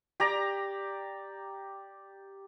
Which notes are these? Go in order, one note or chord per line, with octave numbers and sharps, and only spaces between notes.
G4 D5 A#5